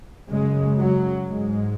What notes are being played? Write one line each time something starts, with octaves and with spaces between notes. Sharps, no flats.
F#2 C#3 G#3
F#3
G#2 G#3